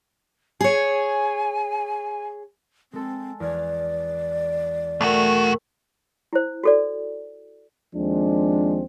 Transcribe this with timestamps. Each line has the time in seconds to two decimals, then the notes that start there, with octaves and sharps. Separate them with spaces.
0.61 G#4 C#5 G#5
2.93 G#3 C4 A4
3.40 E2 D5 F6 G#6
5.01 B1 A3 F#4 A#4 G5
6.33 E4 C5
6.64 F#4 A4 D5
7.95 D#2 F3 G#3 C4 D4